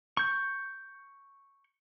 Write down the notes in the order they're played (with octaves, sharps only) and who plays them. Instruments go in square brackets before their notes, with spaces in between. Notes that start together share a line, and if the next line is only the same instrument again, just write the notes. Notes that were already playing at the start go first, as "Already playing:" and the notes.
[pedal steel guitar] C#6 G6